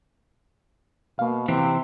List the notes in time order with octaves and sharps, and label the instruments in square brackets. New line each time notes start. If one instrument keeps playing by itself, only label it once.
[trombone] B2 [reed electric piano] A#3 F5
[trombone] C3 [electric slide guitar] E3 C4